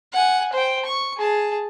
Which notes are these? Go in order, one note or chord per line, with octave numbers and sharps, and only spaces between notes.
F#5 G#5
C5 G5
C#6
G#4 A5